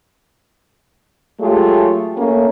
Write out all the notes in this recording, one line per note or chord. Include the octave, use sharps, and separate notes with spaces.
F#3 G#3 A3 F4 G4
A3 A#3 C#4